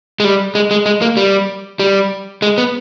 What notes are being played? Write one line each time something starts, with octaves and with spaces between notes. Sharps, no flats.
G#3
G3
G#3
G#3
G#3
A#3
G3
G3
G#3
B3